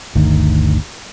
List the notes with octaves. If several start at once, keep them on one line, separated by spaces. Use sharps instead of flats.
G1 D2 D#3